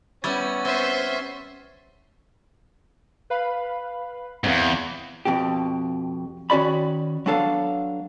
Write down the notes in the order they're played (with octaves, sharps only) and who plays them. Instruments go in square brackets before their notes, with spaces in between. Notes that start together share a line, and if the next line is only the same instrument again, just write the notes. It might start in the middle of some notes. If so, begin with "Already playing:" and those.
[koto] G3 E4 [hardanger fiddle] B3 C#4 [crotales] C#6 G#6 A6
[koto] C4 [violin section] C5 E5 C6 [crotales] C#6 F6 C7
[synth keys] B4 F5 B5
[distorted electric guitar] E2 G#2 [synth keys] C4 F5
[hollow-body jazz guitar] F2 B2 G4
D#3 C#4 F#4 D5 B5
F#3 B3 D4 A4 F5